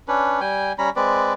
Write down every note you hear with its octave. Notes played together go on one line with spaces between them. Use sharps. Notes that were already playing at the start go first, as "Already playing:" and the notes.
C#4 D4 B4
G3 G5 G#5
G3 C#4 A#5 B5
G#3 C4 B4 D5